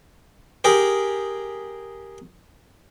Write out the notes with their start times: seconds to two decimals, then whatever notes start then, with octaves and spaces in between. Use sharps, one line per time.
0.64 G4 G#4 A#4